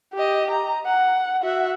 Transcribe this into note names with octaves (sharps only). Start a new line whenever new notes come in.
G4 D#5
A#5
F#5
F#4 E5